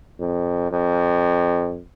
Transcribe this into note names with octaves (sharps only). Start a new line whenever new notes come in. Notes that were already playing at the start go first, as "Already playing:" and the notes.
F2
F2